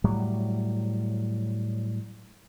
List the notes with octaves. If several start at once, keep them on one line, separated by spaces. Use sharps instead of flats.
A2 F#3 G3